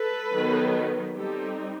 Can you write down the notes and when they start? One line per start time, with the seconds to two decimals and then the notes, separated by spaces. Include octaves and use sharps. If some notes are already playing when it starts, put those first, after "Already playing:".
Already playing: A4 B4
0.33 D#3 F#3 B3
1.16 G3 C4 D#4 G4 A4